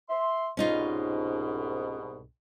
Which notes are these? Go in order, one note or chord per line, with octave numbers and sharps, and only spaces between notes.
E5 C6
C2 G#2 B2 C#4 D#4 F4